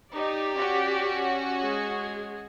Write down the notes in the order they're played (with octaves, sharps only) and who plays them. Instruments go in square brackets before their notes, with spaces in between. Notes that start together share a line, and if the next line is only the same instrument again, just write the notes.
[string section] D#4 [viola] G4 D5
[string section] C#4 F#4
[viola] G#3 G#4